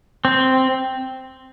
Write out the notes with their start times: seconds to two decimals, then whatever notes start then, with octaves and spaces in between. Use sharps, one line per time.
0.25 C4